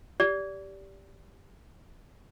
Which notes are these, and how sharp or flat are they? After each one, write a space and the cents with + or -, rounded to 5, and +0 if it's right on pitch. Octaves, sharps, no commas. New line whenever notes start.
G4 +0 D5 -25